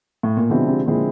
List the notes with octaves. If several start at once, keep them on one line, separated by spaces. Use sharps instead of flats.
A2
A#2
B2 D3 F3 G#3 C4 E4
C3
A#2 D3 F3 G#3 C4 E4